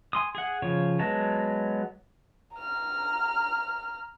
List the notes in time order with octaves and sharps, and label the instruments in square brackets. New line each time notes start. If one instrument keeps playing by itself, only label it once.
[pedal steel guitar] G#5 C6 D#6
G#4 F#5
C#3 F3 C#5
F#3 G#3 B3 A5 A#5
[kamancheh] A#5 F6